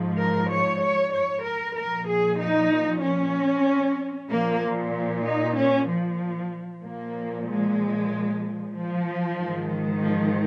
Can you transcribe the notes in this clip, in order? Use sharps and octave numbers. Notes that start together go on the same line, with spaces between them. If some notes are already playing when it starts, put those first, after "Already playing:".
Already playing: G#2 F3
A#4
C#5
C#5
C#5
A#4
A#2 F3 A#4
G#4
D#4
C#4
A#2 F3 A#3
F3
D#4
C#4
F3
A#2 F3 A#3
G#3
F3
G#2 D#3
F3